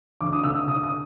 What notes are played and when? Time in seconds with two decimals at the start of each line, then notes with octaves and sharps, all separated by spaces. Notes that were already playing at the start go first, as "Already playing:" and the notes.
0.21 D2 D6
0.32 D#6
0.44 D3 E6
0.55 D#6
0.67 D3 D#6
0.83 D#6